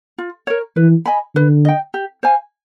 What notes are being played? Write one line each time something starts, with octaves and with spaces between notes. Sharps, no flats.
F4
A#4 C#5
E3 B4
D#5 G#5 B5
D3 B4
D#5 G5
G4
C5 F5 G#5